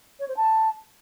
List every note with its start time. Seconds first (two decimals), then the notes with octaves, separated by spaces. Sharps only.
0.20 C#5
0.28 C5
0.37 A5